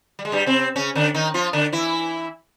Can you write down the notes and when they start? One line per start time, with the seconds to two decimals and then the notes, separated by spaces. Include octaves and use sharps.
0.19 G3
0.25 G#3
0.32 G2 G3
0.47 C3 C4
0.76 C#3 C#4
0.95 D3 D4
1.14 D#3 D#4
1.34 F3 F4
1.53 D3 D4
1.72 E3 E4